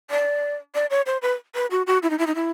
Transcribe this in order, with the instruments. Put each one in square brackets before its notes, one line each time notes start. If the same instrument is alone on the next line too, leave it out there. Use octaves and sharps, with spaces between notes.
[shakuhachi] D5
D5
C#5
C5
B4
B4
F#4
F#4
E4
D#4
E4
D#4
E4